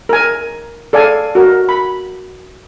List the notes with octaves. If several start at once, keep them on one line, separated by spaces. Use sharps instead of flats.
A#4 G#5
A4 D5 F5 G#5
F#4 A#4
B5